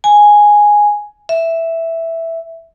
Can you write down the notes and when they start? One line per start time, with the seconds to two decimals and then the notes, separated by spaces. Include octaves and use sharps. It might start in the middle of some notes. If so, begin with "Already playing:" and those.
0.04 G#5
1.29 E5